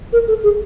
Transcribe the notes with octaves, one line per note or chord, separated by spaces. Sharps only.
A#4
A4
G#4